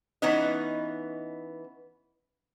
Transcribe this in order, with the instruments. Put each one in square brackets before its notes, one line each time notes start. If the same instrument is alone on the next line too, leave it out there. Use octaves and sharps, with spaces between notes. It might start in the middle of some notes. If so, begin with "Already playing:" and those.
[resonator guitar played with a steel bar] E3 B3 C#4 D#4 B4 D#5